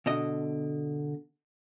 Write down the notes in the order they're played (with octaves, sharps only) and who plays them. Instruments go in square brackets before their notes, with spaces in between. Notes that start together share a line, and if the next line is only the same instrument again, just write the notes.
[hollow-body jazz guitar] B2 D3 D#5